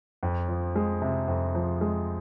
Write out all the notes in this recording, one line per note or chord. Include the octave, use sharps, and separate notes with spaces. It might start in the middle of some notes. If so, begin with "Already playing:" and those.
F2
F3
G#3
C3
F2
F3
G#3